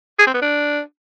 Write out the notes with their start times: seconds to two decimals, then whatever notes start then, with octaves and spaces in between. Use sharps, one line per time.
0.19 G#4
0.27 C4
0.34 B3
0.42 D4